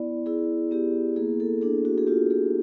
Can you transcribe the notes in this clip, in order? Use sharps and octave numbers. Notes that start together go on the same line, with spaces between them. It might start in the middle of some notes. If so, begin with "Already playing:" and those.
Already playing: B3 E4 D5
E4 G#4
B3 G4
A#3 G#4
A4
D4 G#4
F#4
G#4
F4 G4
G#4